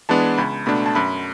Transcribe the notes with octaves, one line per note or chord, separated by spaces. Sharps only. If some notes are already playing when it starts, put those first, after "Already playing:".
E3 G#3 B3 D4 A5
C#2 B5
B2 A3 D4 B5
A5
F#2 B5